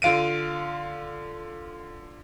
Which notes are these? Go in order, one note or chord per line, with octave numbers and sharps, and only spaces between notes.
D3 F4 F5 D7 D#7